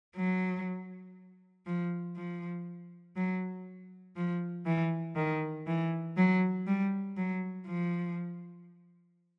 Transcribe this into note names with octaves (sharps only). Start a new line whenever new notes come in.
F#3
F3
F3
F#3
F3
E3
D#3
E3
F#3
G3
F#3
F3